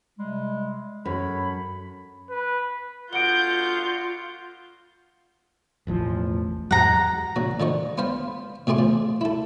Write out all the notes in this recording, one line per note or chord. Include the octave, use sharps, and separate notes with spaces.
C3 G3 G#3
F#2 A4 C#5 B5
B4
B2 D3 F4 F#5 G6 D7 G7
E1 A1 F3
E2 G#2 F#3 F#5 A#5
A#1 F#4
D3 F3 D#5 C#6
B3 C5 F5 B5
B2 A3 G#4 C6 D6
F3
E4 A4